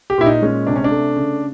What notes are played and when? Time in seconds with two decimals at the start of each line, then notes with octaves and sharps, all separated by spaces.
0.10 G4
0.18 A#2 E4
0.26 D#4
0.42 G#3 C#4
0.67 C3 D4
0.76 C#4
0.84 D4
0.91 A3
1.16 C#3